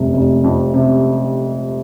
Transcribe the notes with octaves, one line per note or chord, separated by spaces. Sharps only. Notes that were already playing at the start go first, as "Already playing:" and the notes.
Already playing: F1 C3
F1
F2
C3